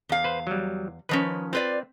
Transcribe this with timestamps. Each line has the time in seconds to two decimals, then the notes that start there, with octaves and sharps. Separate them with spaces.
0.09 E2 F5
0.24 B4 C5
0.47 F#3 G3
1.09 D#3 F3 C#4 B4 C#5
1.53 C4 F4 B4 D5